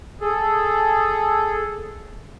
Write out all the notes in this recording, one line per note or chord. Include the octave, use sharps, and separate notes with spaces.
G#4 A4